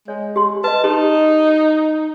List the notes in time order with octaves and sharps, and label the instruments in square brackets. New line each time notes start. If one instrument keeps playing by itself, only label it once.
[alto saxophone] G#3 [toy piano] C#5
[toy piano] G4 C6
[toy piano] B4 D#5 [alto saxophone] A5
[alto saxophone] D#4 [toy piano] G4